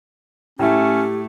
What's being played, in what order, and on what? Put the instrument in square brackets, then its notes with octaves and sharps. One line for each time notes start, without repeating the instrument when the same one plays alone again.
[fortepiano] A2 E4 [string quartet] A3 [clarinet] C#4 [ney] G4